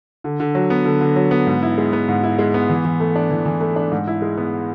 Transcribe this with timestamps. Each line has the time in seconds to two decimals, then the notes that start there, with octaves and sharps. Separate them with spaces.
0.24 D3
0.40 D3
0.55 F#3
0.70 B3
0.85 D3
1.01 D3
1.16 F#3
1.31 B3
1.47 G#2
1.63 E4
1.78 G#3
1.93 B3
2.08 G#2
2.23 E4
2.39 G#3
2.54 B3
2.69 E3
2.85 E3
3.00 A3
3.15 D4
3.31 E3
3.46 E3
3.61 A3
3.76 D4
3.92 G#2
4.07 E4
4.22 G#3
4.37 B3